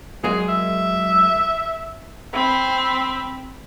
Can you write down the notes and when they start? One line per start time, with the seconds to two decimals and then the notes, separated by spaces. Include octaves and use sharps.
0.24 F#3 G#3 A#3 G#4
0.49 E5
2.33 C4 B5